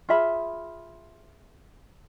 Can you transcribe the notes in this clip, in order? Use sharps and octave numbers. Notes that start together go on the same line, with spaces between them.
F4 G#4 E5 B5